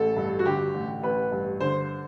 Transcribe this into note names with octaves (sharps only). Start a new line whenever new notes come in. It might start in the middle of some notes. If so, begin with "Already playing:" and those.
Already playing: A1 A4
G2
F#4
D3 G4
A1
A1 B4
G2
D3 C5